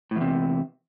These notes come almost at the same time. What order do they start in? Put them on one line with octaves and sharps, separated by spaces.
A2 E2 C3